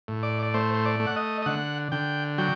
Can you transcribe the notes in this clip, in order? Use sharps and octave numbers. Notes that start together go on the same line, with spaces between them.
A2
D5
D5
A3 C5
C5
D5
A3
F#5
D#5
D#5
D3 F#5
D3 G5
F#3 G5